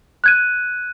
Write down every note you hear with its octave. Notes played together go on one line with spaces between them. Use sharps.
F#6 G#6 D#7